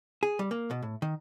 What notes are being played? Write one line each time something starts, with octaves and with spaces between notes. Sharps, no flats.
G#4
G3
A#3
B2
A2
D#3